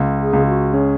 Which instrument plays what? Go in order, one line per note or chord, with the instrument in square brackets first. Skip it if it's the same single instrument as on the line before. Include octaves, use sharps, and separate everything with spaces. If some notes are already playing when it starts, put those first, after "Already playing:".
Already playing: [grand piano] C#2
[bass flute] G#4
[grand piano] C#2
[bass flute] F#4
[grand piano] C#4 [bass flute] G#4